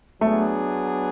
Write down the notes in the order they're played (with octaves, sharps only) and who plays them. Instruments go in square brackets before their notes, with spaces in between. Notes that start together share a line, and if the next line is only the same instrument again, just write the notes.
[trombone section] F#3 B3 D4 G#4 [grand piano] A3